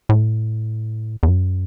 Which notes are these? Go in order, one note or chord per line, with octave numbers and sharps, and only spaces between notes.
A2
E2
F#2